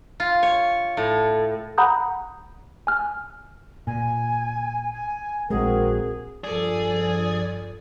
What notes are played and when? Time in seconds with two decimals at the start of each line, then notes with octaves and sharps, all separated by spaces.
0.20 F4
0.43 C#5
0.97 A2
1.78 F#5 A#5 B5 D#6 G6
2.87 G#5 F6
3.87 A#2 G#5
4.93 G#5
5.50 A#1 G#3 C4 F#4 G#4 A#4
6.44 G2 F3 G#4 A4 D5